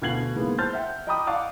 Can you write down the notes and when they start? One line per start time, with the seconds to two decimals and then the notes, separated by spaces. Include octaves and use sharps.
0.02 D2 B2 F4 G#6 C7 F#7
0.36 G#2 C#3 E3 G#3 A#3 B3
0.58 C5 A5 C6 F6 G6 A6
0.73 E5 F#5 G5
1.07 D#5 G5 A#5 B5 D6 D#6
1.27 D5 F5 F#5 A5 C#6 D6